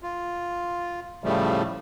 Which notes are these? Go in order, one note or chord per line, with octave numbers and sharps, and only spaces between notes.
F4
A2 C#3 F3 G3 A3